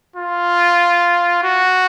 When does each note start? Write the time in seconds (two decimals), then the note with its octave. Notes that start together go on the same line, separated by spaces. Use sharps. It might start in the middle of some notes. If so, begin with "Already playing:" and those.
0.16 F4
1.43 F#4